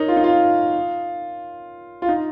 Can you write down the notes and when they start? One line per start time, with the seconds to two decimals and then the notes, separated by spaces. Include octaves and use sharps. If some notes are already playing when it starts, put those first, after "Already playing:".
Already playing: D#4 A#4 C#5
0.08 F4
0.17 D#4
0.24 F4
2.02 F4
2.09 D#4